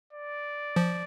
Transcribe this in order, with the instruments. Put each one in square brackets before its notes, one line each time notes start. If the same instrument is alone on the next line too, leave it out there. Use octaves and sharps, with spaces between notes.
[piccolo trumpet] D5
[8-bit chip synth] F3